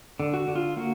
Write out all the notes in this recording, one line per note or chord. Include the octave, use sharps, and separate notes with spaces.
D3
F#4
D3
F4
A#3 F#4